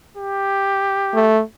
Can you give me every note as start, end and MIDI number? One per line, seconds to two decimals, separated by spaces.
0.17 1.31 67
1.14 1.41 57